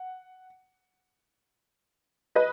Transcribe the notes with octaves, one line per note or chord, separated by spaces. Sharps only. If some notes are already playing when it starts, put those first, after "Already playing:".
Already playing: F#5
B4 D#5